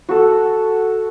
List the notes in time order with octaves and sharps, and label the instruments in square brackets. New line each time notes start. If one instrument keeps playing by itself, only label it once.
[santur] F#4 A4